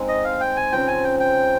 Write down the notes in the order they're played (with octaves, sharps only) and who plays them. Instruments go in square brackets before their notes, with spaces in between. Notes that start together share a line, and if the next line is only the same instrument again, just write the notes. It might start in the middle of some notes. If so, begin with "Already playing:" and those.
Already playing: [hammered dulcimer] G#3 C4 D#4
[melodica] D#5
F5
G5
G#5
[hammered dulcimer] C#3 F3 C4 [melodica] G5
[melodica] G#5
G5
G5